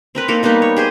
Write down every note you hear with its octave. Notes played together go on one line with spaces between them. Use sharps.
C4 A#4 B4
A#3 D#4 A4 A#4
G3 A#3 B3 D#4
C#5
G4 G#4 C5